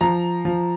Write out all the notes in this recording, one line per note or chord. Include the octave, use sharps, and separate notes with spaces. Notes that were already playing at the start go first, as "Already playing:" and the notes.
F3 A#5
F3